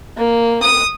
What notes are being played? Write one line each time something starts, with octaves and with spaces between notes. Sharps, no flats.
A#3
D#6